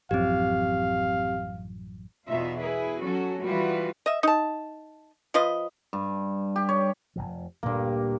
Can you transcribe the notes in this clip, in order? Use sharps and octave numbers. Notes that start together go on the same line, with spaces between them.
A1 F#2 F3 C4 G4 F5
E2 B2 D#4 F4 E5
E4 G#4 B4
F#3 C#4 F#4 A4
E3 G3 F4 F#4 B4
D#5 E5
D#4 A5
F3 F4 B4 D#5
G2
G4
C#5
F1 C2 F3
D2 G2 A#2 A#3 D4